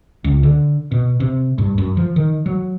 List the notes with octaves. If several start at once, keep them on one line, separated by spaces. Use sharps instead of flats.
C#2
D3
B2
C3
G2
F#2
F3
D#3
F#3